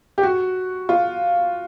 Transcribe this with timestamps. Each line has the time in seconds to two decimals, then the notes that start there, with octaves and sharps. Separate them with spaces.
0.18 G4
0.23 F#4
0.89 F4